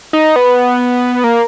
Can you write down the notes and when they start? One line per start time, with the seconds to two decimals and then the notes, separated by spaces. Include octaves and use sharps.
0.13 D#4
0.36 B3
1.24 A#3